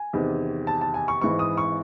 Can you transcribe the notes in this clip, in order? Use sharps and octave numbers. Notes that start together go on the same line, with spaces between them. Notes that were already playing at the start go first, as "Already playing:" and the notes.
Already playing: G#5
E2 C3 D#3
A5
A5
G#5
C#6
G#1 G#2 E3 C#6
D#6
C#6